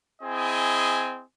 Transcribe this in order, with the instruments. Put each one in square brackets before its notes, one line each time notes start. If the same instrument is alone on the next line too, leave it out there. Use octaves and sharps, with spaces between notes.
[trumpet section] C4 E4 G#4 D#5 G#5